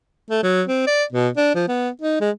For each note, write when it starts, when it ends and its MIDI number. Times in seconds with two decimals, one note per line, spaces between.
0.30 0.41 57
0.43 0.62 54
0.67 0.84 60
0.87 1.04 74
1.13 1.29 47
1.37 1.50 62
1.55 1.66 53
1.68 1.89 59
2.01 2.21 63
2.21 2.30 56